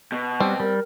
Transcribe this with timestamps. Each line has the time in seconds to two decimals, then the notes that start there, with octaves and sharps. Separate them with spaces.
0.12 B2
0.40 G3 C4
0.60 G3 A#4